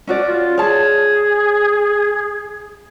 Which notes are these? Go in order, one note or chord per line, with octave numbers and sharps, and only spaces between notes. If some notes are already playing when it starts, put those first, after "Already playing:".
C#4 F#4 D5
F4
G#4 C#5 A5